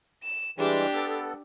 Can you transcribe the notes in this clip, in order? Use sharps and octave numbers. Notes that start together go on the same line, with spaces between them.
E7
E3 G3 G#3 D4 G4
B3 A4